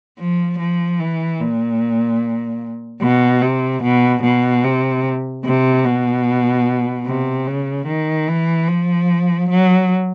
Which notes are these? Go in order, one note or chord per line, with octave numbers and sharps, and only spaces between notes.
F3
F3
E3
A#2
B2
C3
B2
B2
C3
C3
B2
C3
C#3
D#3
E3
F3
F#3